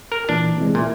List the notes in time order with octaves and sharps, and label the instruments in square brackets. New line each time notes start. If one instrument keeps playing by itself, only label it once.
[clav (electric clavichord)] A#4
[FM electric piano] A#2 E3 [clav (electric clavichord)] D4
[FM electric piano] C3 E3 G#3
[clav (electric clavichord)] A#2 [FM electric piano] A#3 E4